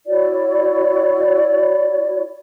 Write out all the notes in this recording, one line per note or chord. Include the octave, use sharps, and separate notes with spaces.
E4 F#4 C#5 D5